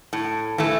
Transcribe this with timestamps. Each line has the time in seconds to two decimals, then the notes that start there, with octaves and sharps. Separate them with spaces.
0.13 A2
0.58 E3 A3